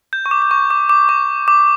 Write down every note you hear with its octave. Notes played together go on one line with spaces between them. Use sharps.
G6
C#6
D6
D6
C#6
D6
D6
C#6
D6